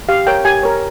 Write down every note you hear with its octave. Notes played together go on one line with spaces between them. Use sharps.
G4 F5
A#4 C#5 G5
G4 G#5
A#4 C#5